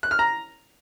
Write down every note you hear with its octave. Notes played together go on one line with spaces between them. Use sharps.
F#6
F6
A#5